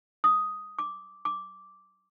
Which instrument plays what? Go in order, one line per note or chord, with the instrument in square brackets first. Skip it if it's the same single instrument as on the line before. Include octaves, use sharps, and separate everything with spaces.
[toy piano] D#6
D6
D6